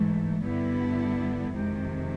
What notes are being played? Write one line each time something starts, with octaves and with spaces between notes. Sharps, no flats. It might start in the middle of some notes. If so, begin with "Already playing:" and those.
Already playing: G#2 E3 A3
G2 D3 G3 B3 E4
F2 C3 D#3 G#3